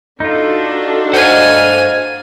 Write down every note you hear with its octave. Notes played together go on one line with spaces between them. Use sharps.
D4 D#4 F4 F#4 A4
C5 D#5 F5 F#5 G#5